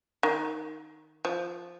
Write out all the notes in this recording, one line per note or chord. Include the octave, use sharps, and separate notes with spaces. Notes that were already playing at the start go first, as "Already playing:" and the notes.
D#3
F3